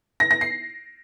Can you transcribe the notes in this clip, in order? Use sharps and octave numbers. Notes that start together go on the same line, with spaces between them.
A#6
A#6
C7